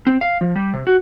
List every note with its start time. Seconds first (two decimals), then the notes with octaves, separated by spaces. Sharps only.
0.07 C4
0.21 F5
0.41 F3
0.56 G3
0.74 C3
0.87 F#4